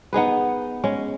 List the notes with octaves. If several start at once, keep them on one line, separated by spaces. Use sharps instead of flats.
B3 D#4 G#4 B4
G#3 C#4